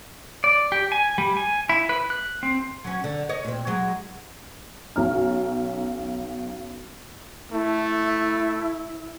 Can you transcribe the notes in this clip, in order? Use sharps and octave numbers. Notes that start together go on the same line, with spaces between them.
D5
G4
G#5
G3
G#5
E4
B4
F#6
C4
F#3 C#4
D3
C#5 D#5
A#2 C4
F#3 G#3
B1 C#4 A#5 F6
A3 E4